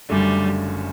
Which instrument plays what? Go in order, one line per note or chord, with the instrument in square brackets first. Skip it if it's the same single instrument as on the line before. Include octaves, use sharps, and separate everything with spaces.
[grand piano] F#1 F#2 D3 A3 D4 [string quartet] G3